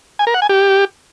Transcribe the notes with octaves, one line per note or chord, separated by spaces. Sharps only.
G#5
A#4
F#5
G#5
G4